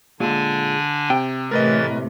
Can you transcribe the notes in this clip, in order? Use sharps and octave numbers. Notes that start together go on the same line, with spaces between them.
A#2 D3 G#3 D4 F4 G#5
C3 G5
A2 C3 E3 A3 A#4 B4 D#5 A6